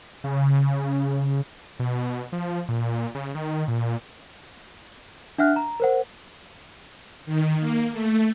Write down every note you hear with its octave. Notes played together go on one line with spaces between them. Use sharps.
C#3
B2
F3
A#2
C#3
D#3
A#2
D4 E5 F#5 F6 F#6
A#5
A#4 C5 F#5
D#3
A#3
A3